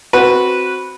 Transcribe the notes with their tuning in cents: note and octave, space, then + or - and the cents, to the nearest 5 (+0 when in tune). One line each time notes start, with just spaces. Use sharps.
C4 +0 F#4 +0 B4 -10